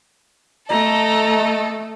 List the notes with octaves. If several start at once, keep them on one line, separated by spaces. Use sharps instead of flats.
A3 A4 D#5 A#5